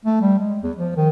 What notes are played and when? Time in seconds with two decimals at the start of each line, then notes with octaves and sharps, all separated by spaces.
0.05 A3
0.21 G3
0.39 G#3
0.63 E2
0.77 F3
0.96 D#3